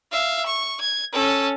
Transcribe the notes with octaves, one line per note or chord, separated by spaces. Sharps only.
E5 F5
C#6
G#6
C#4 A4